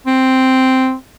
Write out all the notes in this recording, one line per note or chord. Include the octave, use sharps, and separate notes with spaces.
C4